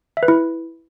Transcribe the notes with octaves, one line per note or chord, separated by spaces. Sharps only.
E5
B4
E4